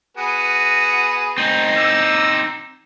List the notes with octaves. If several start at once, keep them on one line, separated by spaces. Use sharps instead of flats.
B3 F#4 G#4
C4 D#4
D6 E6